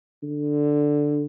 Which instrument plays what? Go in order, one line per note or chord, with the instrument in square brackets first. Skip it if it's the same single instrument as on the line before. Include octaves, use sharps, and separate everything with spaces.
[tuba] D3